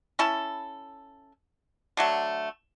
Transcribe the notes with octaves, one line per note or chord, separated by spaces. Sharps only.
C#4 E4 A4
D3 F#3 A3